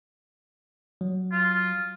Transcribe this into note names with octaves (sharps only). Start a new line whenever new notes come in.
F#3
F4